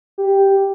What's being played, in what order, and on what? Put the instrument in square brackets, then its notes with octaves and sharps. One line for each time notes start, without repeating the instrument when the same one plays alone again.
[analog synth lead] G4